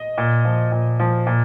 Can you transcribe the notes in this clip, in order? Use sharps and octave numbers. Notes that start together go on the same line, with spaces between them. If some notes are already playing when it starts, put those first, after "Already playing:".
Already playing: D#5
A#2
F3
A#2
F3
A#2